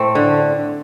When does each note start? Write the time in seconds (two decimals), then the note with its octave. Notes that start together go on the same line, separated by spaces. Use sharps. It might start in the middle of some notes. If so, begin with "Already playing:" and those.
Already playing: A2 A3 C4
0.15 D3